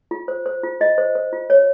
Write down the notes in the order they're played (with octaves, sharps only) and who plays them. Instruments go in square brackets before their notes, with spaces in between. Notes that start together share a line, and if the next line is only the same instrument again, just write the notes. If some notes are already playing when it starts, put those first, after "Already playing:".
[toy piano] F4
C5
C5
F4
F4 D#5
C5
C5
F4
C#5